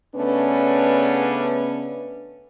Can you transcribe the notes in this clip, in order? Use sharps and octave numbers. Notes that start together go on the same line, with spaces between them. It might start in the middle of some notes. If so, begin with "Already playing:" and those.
C#3 A3 B3 C#4 D4 B4